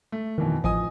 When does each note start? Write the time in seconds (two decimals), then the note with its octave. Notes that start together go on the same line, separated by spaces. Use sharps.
0.12 A3
0.38 F2 B2 D#3 E3
0.64 A1 F3 D#5 G#5 D#6